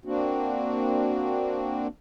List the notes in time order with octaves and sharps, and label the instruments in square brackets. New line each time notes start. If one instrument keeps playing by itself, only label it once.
[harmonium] A#3 C4 D4 F#4